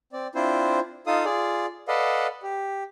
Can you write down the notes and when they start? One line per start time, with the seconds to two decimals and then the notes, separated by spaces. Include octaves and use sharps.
0.13 C4 D5
0.35 C4 D4 E4 F4 C5
1.07 D#4 F4 A4 F5 D#6
1.25 F4 G#4 D5
1.88 A4 B4 D5 D#5 F5 F#5
2.43 G4